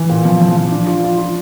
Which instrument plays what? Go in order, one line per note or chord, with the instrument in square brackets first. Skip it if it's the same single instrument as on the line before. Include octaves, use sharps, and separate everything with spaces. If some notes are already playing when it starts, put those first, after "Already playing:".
Already playing: [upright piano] E3
A#2
F3
F3
F3
D4
F4
F4
F4